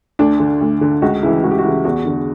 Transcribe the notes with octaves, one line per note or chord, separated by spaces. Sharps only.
D2 D4
D3
D2
D3
C#2 F#4
C#3 E3 E4
C#2 F#4
G4
F#4
C#3 E3
E2 F#4
D3